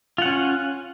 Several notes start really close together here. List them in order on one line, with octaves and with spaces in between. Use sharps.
F4 F#5 C#4